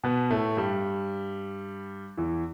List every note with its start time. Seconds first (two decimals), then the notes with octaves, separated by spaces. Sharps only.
0.04 B2 B3
0.31 A2 A3
0.57 G2 G3
2.18 E2 E3